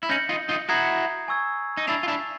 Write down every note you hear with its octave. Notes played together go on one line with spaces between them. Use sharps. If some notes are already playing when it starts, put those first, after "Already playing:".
E4
C#4 D#4 G6 A#6 C#7 F#7
D#4 F4
D#4 F4
E4 F#4 A#5 D#6 G#6 C7
G#5 C#6 E6 G#6
D#4
D4 E4 E6 A6 C7 F7
F4
D4 E4